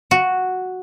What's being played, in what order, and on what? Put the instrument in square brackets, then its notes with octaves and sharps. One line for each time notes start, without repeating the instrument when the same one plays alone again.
[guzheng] F#4